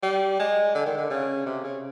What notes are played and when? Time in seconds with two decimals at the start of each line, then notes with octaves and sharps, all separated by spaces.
0.03 G3
0.39 G#3
0.75 D3
0.86 D#3
0.98 D3
1.10 C#3
1.46 C3
1.64 C#3